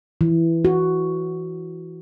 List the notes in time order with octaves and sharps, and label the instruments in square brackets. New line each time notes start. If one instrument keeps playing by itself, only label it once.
[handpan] E3
F#4